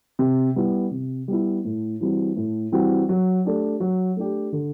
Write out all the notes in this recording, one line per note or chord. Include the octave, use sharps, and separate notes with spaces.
C3
G3 B3 E4
C3
G3 B3 E4
A2
E3 G3 C4 F#4
A2
E3 G3 C4 F#4
F#3
A3 D4 G4
F#3
A3 D4 G4
D3